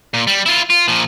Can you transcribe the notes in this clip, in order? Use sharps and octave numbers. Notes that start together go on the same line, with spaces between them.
A#2
G3
E4 F4
F4
A#2 F3